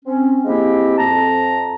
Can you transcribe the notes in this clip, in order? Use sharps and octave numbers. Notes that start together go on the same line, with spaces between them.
C4 C#4
F3 G#3 A#3 C4 E4 G4
F2 A5 A#5